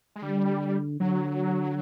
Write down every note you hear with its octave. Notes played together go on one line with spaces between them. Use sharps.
G#3
D3 G3
D3 F#3